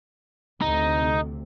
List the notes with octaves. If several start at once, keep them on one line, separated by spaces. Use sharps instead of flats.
D2 C3 D#4